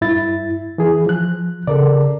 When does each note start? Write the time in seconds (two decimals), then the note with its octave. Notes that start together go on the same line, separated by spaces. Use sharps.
0.01 G2 E4 A6
0.78 E3 G#4
1.07 F3 F#6
1.67 C#3 A4 A#4 D5